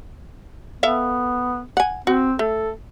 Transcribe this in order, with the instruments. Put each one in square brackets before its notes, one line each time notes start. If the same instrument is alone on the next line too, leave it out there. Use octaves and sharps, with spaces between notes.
[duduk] B3 [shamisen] A4 E5 F5
[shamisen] F#5 G#5
[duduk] C4 [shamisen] F#4
[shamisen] A3 [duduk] A4